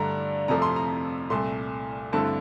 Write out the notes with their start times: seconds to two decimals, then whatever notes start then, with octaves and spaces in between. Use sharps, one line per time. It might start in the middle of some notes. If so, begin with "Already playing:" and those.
Already playing: G2 D3 A3 D4 A#5
0.48 F2 C3 F3 A3 A#5
0.62 C6
0.76 A#5
1.30 C2 A#2 A3 C6
2.13 G2 D3 A3 C4 E4 A5